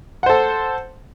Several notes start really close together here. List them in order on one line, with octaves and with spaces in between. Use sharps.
F#5 C5 A4